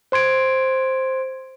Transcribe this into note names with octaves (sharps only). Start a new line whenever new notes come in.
C5 C6 G#6 D7